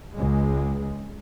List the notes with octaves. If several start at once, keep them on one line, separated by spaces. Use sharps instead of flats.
C#2 G#3